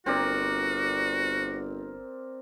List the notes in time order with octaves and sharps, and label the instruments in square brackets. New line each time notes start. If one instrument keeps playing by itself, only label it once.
[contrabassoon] G1 [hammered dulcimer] C4 A#4 D5 [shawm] F#4